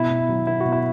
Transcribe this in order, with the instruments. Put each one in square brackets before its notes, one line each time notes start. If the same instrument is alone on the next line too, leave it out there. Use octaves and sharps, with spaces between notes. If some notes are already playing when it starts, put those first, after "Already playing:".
Already playing: [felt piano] B2 [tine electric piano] E4
[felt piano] B2
F#3
[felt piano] B3 [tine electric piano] E4
[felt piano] B2 [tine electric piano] F#4
[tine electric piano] E4